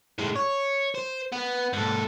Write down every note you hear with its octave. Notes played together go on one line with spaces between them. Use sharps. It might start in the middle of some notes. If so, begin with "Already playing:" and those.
A2 G#3
C#5
C5
B3
G#2 A4